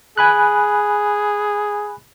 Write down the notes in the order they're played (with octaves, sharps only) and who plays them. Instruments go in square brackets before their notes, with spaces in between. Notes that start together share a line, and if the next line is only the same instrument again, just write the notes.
[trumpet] G#4 [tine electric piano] G#5 B5 F#6